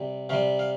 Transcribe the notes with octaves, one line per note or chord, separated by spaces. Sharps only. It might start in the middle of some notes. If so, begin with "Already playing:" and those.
Already playing: C3 G3
C3 G3 F5
F5